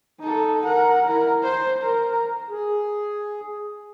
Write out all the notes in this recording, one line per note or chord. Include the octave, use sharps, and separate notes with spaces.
D#4 A4
A#4 F#5
E4 A#4
C5
A#4
G#4